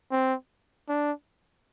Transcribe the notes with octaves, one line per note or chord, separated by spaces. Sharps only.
C4
D4